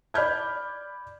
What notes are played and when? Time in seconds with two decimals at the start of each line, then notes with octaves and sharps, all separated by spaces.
0.14 D5 B5 F6 G6 G#6